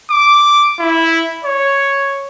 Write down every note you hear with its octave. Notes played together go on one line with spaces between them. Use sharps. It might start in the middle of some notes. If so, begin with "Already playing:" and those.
D6
E4
C#5